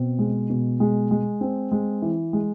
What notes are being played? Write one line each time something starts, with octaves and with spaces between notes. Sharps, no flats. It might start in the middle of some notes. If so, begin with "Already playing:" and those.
Already playing: B2 C4
G#3
B2
G#3
G#3
C4
G#3
E3
G#3